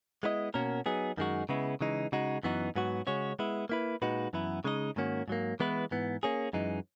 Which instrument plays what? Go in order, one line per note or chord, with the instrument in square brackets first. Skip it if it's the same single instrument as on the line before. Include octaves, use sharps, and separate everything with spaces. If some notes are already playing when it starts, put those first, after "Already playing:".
[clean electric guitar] G#3 B3 E4 B4 D#5
B2 A#3 C#4 F#4 A#4
F#3 B3 D#4 G#4
F#2 D#3 G#3 D#4 F#4
C#3 G#3 B3 E4
C#3 E3 G#3 D#4
C#3 G#3 D#4 F#4
F#2 E3 B3 D#4 F#4
G#2 F#3 B3 F#4
C#3 G#3 C#4 F#4 C#5
G#3 B3 E4
A#3 E4 B4
A#2 G#3 D#4 F#4 B4
F#2 E3 B3 E4
C#3 G#3 D#4 A#4 D#5
G#2 D#3 A#3 C#4 F#4
G#2 F#3 A#3
E3 G#3 B3 E4 B4
G#2 E3 B3
A#3 C#4 G#4
F#2 E3 G#3 D#4